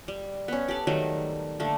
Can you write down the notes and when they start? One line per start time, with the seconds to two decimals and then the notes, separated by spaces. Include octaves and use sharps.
0.08 G3
0.48 B3 C#4
0.68 G4 A4 D5
0.87 D#3 F#3 G3 A3
1.60 D3 A3 A#3